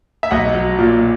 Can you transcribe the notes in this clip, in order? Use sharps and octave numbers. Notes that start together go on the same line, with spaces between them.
E5
B1 D#5 F#5
F#3
A#2